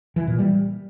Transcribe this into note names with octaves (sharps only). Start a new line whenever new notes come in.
E3
A#2
G3